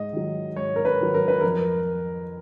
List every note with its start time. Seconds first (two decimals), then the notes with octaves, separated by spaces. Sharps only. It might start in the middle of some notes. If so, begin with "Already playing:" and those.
Already playing: G#2 D#5
0.13 D#3 F#3
0.56 G#2 C#5
0.76 A#4
0.85 B4
1.00 D#3 F#3
1.14 A#4
1.28 B4
1.41 F2 A#4